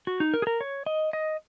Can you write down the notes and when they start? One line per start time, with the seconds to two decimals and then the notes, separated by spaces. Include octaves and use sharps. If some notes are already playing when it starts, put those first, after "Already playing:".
0.07 F#4
0.20 D#4
0.34 A#4
0.42 G#4
0.47 A#4
0.61 C#5
0.86 D#5
1.13 D#5